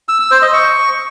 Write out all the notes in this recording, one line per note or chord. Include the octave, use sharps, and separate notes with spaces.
E6
E6
C5
D#5
C#6